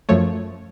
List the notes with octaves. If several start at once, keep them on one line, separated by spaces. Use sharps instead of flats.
F#2 F3 A3 C#5